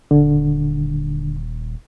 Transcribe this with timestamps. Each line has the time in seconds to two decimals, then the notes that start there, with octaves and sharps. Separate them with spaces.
0.11 D#1 D3